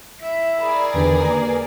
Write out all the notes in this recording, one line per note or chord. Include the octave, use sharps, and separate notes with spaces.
E4 E5
G#4 A#4 D5 B5
E2 D3 D#3 G4 B4
A#3 A#5